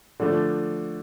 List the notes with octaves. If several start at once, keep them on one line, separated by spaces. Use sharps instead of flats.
D3 F3 A3 D4